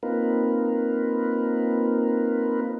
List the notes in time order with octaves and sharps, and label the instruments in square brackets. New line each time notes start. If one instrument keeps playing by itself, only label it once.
[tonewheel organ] A#3 C4 D#4 F4 A#4 B4